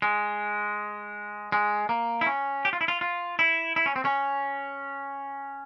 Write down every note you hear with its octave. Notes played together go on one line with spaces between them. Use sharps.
G#3
G#3
A#3
E4
C#4
G4
F4
E4
F4
F4
E4
E4
C#4
C4
C#4